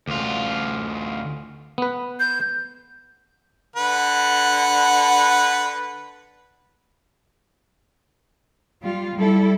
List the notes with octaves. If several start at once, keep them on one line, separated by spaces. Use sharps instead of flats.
D2 F4
B3 B4
G6
D3 B4 F#5
G3 F4
G3 E4 A4